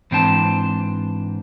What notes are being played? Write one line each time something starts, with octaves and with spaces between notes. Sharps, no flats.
G#2 E3 C4 D4 C5 A5